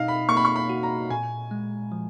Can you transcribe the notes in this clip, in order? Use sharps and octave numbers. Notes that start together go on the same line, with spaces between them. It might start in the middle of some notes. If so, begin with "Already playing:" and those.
Already playing: B2 D#4 D#5 F5
B5
A#3 C#6
B5
C#6
B5
F#4
A#5
A#2 G#5
G#3
F3